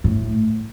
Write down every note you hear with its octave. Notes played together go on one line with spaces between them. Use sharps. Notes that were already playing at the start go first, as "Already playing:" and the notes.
A2